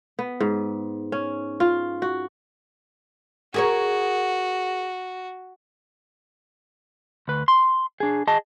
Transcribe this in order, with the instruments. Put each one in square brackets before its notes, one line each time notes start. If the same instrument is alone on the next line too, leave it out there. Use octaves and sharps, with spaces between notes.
[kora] B3
G#2
C#4
F4
F#4
[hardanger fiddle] F#4 [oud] G#4 A#4 C#5
[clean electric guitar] D2 B4
C6
D4 G#4
G#4 D#5 A5